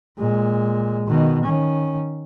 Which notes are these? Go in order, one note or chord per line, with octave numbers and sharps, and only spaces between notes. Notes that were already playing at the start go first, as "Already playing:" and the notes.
A#2 G#3
B2 D#3
D#3 C#4